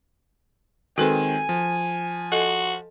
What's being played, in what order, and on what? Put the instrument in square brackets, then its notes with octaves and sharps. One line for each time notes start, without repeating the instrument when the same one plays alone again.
[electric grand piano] D#3 G#3 C4 [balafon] F#4 A4 B4 [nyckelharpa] G#5
[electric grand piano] F3
[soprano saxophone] F#4 [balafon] A4 D#5